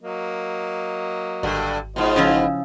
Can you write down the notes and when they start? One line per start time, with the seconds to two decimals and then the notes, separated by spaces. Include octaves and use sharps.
0.03 F#3 A#3 D#5
1.43 G#1 G2 D3
1.96 G#2 B2 F4 C5 D#5
2.16 C#3 F3 E4